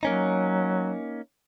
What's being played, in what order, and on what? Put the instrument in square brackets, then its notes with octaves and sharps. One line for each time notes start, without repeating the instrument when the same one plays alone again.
[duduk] F#3 [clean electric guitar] A#3 C#4 D#4